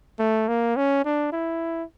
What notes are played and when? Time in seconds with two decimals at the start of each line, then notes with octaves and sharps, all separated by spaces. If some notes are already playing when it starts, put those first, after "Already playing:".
0.19 A3
0.48 A#3
0.76 C#4
1.05 D4
1.32 E4